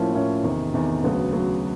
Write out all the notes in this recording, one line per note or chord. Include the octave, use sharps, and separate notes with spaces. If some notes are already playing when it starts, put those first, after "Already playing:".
Already playing: A2 F3 A#3 C#4 E4
A2 F3 A#3 C#4 E4
E2 C3 D#3
E2 C3 D#3
D2 C#3 F#3 B3
D2 C#3 F#3 B3